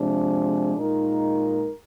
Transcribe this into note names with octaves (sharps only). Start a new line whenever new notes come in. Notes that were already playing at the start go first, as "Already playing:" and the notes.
Already playing: C3 F3 G#3 D4
A#2 G#3 D#4 A#4